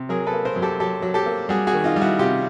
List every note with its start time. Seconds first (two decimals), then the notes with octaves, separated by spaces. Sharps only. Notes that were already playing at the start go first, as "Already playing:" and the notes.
Already playing: C3
0.09 F#3 G#4 A#4
0.27 A4 B4
0.33 A#3
0.45 A#4 C5
0.56 F#2
0.62 G4 A4
0.80 F#3 G4 A4
1.02 F#3
1.14 G4 A4
1.26 A#3
1.49 G3 F#4 G#4
1.67 F#4 G#4
1.73 D#3
1.84 D#4 F4
1.96 G3
2.01 E4 F#4
2.19 C3 F4 G4